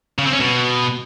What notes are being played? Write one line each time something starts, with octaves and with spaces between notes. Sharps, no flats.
C#3
C4
C#4
B2